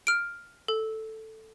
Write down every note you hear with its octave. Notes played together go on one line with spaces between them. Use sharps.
F6 D7
A4